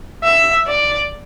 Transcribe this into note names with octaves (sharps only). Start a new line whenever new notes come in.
E5
D5